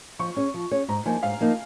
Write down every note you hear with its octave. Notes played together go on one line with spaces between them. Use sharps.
F3 C#6
C#4 G#4 C#5
F3
C#4 G#4 C#5
G#2 A#5
F3 A#3 D#4 G#5
G#2 F5
F3 A#3 D#4